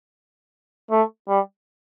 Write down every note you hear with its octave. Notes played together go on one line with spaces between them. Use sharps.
A3
G3